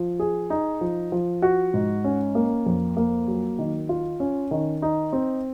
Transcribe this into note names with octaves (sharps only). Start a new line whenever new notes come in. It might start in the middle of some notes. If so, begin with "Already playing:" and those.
Already playing: F3
G#4
D#4
F3
F3
F#4
G#2
C#4
A#3
F2
A#3
F#3
D#3
F4
C#4
D#3
D#4
C4